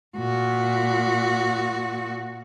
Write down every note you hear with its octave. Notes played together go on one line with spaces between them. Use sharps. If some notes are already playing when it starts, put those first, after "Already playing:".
A#2 F#4